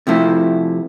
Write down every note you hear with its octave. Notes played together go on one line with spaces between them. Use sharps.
C3 F3 A3 E4